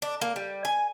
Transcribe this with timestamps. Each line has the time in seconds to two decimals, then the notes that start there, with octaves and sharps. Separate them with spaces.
0.02 D4
0.21 A#3
0.36 G3
0.65 G#5